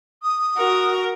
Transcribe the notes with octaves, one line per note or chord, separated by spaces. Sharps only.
D#6
F#4 A#4